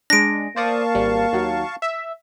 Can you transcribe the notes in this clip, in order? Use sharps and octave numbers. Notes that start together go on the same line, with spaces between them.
G#3 D4 A#6 D7
A#3 C5 D5 F5 A5 C#6 D#6
G#1 G3
D#2 F#3
E5